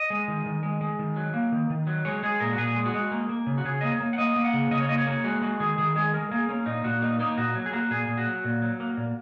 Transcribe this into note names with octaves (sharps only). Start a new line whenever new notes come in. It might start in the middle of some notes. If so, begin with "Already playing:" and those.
Already playing: D#5
G#3
D#3
D#3
G#3
G#3
D#3
F#3
A#3
D#3
D#3
F#3
G#3 C#5
G#3 G#4
A#2 A#4
F#4
A#2 G#4
G#3
F#4
G#3
A#3
A#3
C#3
F#4
C#3 G#4
A#3 D#5
C#5
A#3
F#5
A#3 D#5
A#3
F#5
C#3
C#3 D#5
C#5
A#3 D#5
C#5
A#3
G#3 F#4
G#3 F#4
D#3 G#4
D#3 G#4
G#3 G#4
G#3 A#4
A#3 G#4
A#3 C#4
A#2 D#4
A#2 F#4
A#3 D#4
A#3 D#4
A#2 F#4
F#3
G#4
A#3 F#4
A#2 G#4
A#2
F#4
F#3
A#2
F#3
A#3
A#2